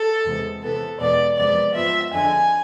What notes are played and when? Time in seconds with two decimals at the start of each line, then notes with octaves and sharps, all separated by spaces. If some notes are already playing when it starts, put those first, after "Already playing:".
Already playing: A4
0.25 E2 C3 G#3 B3
0.62 C3 E3 B3 A4
1.00 E2 B2 G#3 B3 D5
1.37 F2 C3 G#3 B3 D5
1.75 G#2 F3 B3 E5
2.13 F2 D3 G#3 G#5